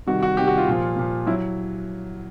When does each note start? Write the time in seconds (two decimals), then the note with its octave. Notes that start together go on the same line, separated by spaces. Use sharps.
0.06 C3 D#3 G3 F#4
0.23 F#4
0.37 C3 D#3 G3 G4
0.47 F#4
0.58 F4
0.67 A#2 F3
0.96 A#2 F3
1.27 F#3 E4